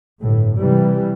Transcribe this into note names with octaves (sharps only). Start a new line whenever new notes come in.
G1 A2
C3 E3 G3